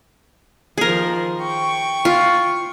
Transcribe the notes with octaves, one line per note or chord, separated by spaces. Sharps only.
D#3 F3 G#4 A#4 C5
G5 C#6
F4